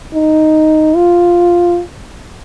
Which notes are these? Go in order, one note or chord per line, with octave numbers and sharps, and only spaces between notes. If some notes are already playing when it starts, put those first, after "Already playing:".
D#4
F4